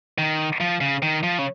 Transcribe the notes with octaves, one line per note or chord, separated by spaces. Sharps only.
D#3
F3
C#3
D#3
F3
C#3